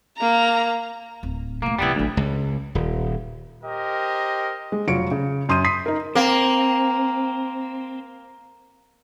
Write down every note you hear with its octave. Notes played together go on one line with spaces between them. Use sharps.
A#3 A#5
D1
A#2 A3 A#3
C2 E3 G3 B3 E4
A1 D2 F#3
C#2
D#1
G4 A#4 C5 D#5
G#3
F1 F#3 F4 C#7 D7
C#3
F#2 C6 D#6 G6 D#7
C6 D#6 B6 C7
D#4 A#4
A#3 C4